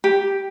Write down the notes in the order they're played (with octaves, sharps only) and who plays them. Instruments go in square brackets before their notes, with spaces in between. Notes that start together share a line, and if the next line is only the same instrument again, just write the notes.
[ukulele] G4